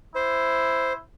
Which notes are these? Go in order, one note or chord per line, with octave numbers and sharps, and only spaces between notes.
E4 C5